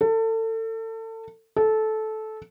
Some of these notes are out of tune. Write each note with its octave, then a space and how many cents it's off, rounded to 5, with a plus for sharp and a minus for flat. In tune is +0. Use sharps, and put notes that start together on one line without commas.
A4 +30
A4 -15